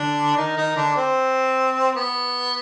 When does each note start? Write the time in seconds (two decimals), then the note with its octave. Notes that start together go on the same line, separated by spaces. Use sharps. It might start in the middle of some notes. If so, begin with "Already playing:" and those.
Already playing: D3 D4
0.37 D#3 D#4
0.57 D#3 D#4
0.76 D3 D4
0.96 C4
1.95 B3